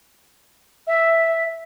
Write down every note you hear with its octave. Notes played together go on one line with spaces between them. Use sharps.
E5